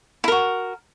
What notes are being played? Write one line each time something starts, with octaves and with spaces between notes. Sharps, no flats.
E4 F#4 A#4